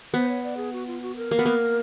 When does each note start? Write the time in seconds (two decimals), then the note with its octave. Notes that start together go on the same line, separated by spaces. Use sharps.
0.13 B3 C5
0.29 C#5
0.44 D5
0.57 G#4
0.73 F#4
0.87 F4
1.02 F#4
1.16 A#4
1.31 A#3
1.39 B3
1.45 A#3